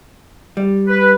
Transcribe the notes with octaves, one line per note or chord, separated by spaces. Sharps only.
G3
B4